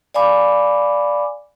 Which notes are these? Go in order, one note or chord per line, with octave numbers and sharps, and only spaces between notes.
D5 F5 G#5 B5 D6